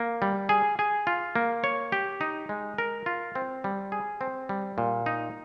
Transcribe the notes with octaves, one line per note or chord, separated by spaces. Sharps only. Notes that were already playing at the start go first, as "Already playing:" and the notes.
Already playing: A#3
G3
G#4
G#4
F4
A#3
C#5
G4
D#4
G#3
A#4
F4
C4
G3
G#4
C4
G3
A#2
D#4